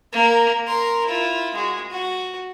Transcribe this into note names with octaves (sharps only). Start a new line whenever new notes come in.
A#3 A#4
A#4 C6
E4 F4
G#3 F#4
F#4